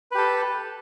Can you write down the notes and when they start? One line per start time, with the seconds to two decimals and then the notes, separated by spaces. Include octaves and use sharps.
0.12 B4
0.15 G4
0.18 A4